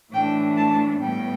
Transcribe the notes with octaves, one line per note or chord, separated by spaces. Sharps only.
A2 E3 A3 D4 G5
A5
A2 G3 B3 G5